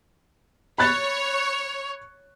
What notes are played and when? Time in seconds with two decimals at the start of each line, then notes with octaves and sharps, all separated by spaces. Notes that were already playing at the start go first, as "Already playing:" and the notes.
0.78 C#5 B5 F#6 A6